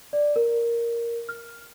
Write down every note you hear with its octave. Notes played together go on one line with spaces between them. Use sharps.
D5
A#4
F6